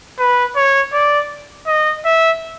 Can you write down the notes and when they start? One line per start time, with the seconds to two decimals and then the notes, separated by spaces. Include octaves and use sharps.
0.19 B4
0.56 C#5
0.93 D5
1.67 D#5
2.05 E5